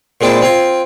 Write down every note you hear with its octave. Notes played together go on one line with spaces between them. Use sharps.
A#2 G#3 C4 D4 E4
C4 F4 G#5